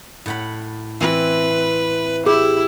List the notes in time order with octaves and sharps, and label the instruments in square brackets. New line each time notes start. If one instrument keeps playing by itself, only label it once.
[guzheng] A2 F#5 B5
[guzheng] E3 C4 [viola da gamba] B4
[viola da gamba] E4 [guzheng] G4 [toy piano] G#4